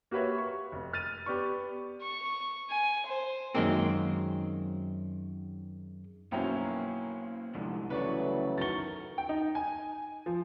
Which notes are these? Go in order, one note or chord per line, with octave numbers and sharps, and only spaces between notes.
A#3 F#4 G4 B4 C#5 E5
C#6
F1
F6 A6 D#7
B3 G4 D5 C#6
C#6
G#5
C5
F#2 D#3 G#3 A#3 C4
B1 F#2 A#3 C#4 E4 C5 G5 A#5
C2 G#2 D3 F3
C#3 E3 F#3 A3 B4 D5 C#6
F#2 D#3 C#6 A6 G7
G5
D#4
G#5
F3